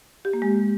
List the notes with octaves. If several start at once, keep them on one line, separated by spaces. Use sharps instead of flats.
G4
A#3
G#3